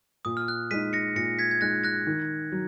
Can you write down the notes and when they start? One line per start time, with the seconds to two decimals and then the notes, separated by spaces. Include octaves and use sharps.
0.25 A#2 D#6
0.37 F6
0.48 F#6
0.71 G#3 D#4 B6 D#7
0.93 A#6 C#7
1.16 A#2 A#6 C#7
1.39 G#6 B6
1.51 G#6
1.61 G#3 D#4 F#6 A#6
1.84 F#6 A#6
2.07 D#3
2.52 F#3